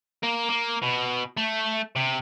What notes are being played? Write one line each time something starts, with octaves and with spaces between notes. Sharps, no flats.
A#3
A#3
B2
A3
C3